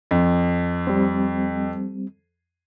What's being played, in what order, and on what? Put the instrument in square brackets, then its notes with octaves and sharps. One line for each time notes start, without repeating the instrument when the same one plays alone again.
[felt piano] F2
[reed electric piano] G3 C4